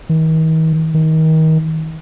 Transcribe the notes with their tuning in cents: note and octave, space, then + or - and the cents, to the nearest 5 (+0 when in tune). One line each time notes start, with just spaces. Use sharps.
D#3 +45
D#3 +30